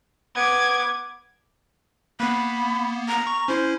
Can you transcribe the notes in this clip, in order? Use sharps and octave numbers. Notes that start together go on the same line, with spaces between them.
B3 D6 G#6
A#3 B3 B5
A#5
C#6
C#4 E4 C5